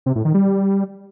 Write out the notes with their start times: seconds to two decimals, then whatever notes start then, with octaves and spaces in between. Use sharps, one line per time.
0.06 C3
0.15 A2
0.25 D#3
0.34 G3